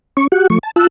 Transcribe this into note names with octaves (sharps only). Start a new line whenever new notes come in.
C#4 C#6
F#4 G4 F#5
F3 A3 C#6
A5
F4 A5 E6 F#6